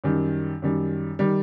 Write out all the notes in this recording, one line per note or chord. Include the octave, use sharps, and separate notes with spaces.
F#2 D#3 G3
F#2 D#3 G3
D#3 G3